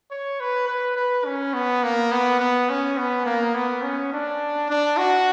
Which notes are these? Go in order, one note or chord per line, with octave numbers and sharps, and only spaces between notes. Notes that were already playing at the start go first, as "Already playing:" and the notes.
C#5
B4
B4
B4
C#4
B3
A#3
B3
B3
C#4
B3
A#3
B3
C#4
D4
D4
F#4